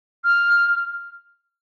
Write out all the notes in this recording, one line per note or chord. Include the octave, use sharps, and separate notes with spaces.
F6